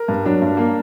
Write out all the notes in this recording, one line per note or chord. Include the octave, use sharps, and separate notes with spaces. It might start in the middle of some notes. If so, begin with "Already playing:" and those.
Already playing: A#4
G2
F#3 D4
G2
A#3